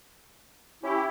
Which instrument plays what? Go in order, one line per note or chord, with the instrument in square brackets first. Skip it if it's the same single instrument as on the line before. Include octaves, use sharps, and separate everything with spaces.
[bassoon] C#4 [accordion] E4 G4